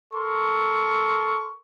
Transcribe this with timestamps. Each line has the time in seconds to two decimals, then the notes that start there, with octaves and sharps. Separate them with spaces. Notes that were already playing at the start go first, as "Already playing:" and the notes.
0.14 A4 A#4 C6 C#6